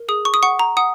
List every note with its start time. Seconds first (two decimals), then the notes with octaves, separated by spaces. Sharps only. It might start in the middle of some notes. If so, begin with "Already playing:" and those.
Already playing: A#4
0.09 G#4 D#6
0.25 C#6
0.34 D#6
0.43 F#5 C#6
0.59 A#5
0.77 F#5 D#6